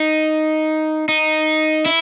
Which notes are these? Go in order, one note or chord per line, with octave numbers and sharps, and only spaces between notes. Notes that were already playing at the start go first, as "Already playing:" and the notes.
Already playing: D#4
D#4
E4